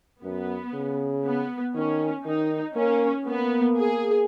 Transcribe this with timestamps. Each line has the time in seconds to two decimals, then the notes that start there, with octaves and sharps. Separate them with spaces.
0.23 F#2 B3
0.74 C#3
1.24 B3
1.75 D#3 C#4
2.25 D#3 D#4
2.76 A#3 C#4
3.27 A#3 B3
3.78 G#4